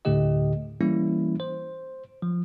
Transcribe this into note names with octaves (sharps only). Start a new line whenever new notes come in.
D2 A2 D3 A3 G4 D#5
E3 G3 A#3 C#4 E4
C5
F3